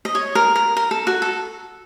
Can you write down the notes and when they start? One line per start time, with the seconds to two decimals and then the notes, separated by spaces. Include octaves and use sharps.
0.05 D#5
0.15 C#5
0.35 A#4
0.56 A#4
0.77 A#4
0.91 A4
1.07 F#4
1.22 A4